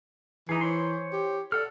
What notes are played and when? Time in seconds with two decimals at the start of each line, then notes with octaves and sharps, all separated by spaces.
0.49 E3 D#4 G#4
0.61 C5 C#5 C6
1.12 G4
1.52 A4 D5 F#5 F6